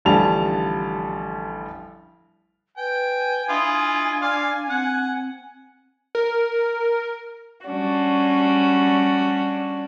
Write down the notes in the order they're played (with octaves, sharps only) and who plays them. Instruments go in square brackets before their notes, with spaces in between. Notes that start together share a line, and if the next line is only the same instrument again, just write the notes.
[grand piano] A1 D3 F3 G3 A5 F7
[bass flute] B4 [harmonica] G5 [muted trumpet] G#5
[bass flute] D4 [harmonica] E4 F4 D#5
[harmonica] D5 F5 C6
[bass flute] C4 [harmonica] F#5
[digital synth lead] A#4
[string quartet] G3 C#4 D4 F#4